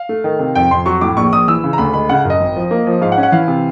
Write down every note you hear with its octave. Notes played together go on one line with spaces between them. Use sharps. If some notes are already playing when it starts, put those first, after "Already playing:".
Already playing: F5
A3
D#3
C3
F2 G5
F2 C6
F#3 C#6
A2 D6
A#1 C#6
A#1 D#6
E3 E6
C#3
A#5
D2 B5
G#3 B5
C#3 F#5
F#2
D#5
G#1
F3
A#3
F3
G#2 F5
F#5
C#4
F#5
E3 F5
C3